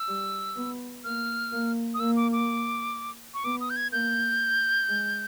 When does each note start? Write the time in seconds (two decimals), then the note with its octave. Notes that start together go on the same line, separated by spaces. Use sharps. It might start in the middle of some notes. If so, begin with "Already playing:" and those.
Already playing: E6
0.08 G3
0.56 B3
1.04 A#3 F6
1.52 A#3
1.94 D#6
2.00 A#3 E6
2.16 D6
2.32 D6
3.34 C#6
3.44 B3 D6
3.61 D#6
3.70 G6
3.76 G#6
3.92 A#3 G6
4.88 G#3